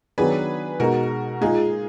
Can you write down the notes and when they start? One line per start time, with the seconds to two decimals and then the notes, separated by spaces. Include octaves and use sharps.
0.18 D#3 F#3 B3 D4 G#4 B4
0.79 B2 G#3 D#4 F#4 A#4
1.41 A#2 G#3 D#4 F4 G#4